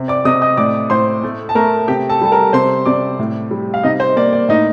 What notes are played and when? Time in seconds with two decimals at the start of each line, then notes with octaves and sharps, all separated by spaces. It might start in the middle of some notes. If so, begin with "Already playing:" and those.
Already playing: C3
0.08 D5 D6
0.25 C3 D#5 D#6
0.41 D#5 D#6
0.57 A2 D5 D6
0.90 A2 C5 C6
1.24 A3
1.49 A5
1.55 A3 A#4 A#5
1.88 C3 G4 G5
2.09 A4 A5
2.21 G3 A5
2.32 A#4 A#5
2.53 C3 C5 C6
2.86 C3 D5 D6
3.19 A2
3.51 G3
3.74 F5
3.83 C3 D#4 D#5
4.00 C5
4.16 A#3 D5
4.33 D5
4.49 A2 D#4 D#5